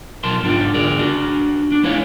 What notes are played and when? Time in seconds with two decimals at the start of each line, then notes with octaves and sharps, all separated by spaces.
0.23 B1 A#4 A5 C6
0.44 G#2 D4 F4 G4
0.74 D3 G#4 A#4 D5
0.99 D4 F#4
1.72 D4
1.84 A3 E4 B4 C#5 F5